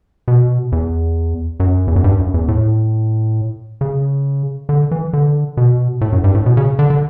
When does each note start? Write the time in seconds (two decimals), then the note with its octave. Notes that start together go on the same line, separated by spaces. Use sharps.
0.28 B2
0.72 E2
1.60 F#2
1.88 E2
1.96 F#2
2.04 G2
2.20 F#2
2.34 E2
2.48 A2
3.81 C#3
4.69 D3
4.91 E3
5.13 D3
5.57 B2
6.01 A2
6.12 F#2
6.24 G2
6.34 A2
6.46 B2
6.57 C#3
6.79 D3
6.90 D3